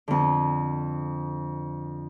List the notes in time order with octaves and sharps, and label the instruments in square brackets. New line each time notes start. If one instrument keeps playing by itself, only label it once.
[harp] F2 D3